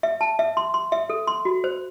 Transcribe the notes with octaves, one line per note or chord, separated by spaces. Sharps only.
E5
A5
E5
C6
C6
E5
A4
C6
F#4
C5